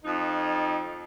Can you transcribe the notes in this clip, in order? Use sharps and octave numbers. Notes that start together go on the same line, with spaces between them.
F2 D#4